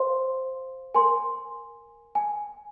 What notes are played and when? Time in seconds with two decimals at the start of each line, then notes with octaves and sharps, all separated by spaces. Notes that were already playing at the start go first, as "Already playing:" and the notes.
Already playing: C5 F5 C6
0.94 A#4 G#5 C6
2.15 G#5